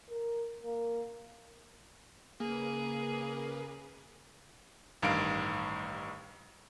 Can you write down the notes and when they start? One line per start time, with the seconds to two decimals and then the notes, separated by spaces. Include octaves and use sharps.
0.10 A#4
0.63 A#3
2.40 C#3 A#3 G#4 A#4 B4
5.02 A1 G2 D#3 F5 D7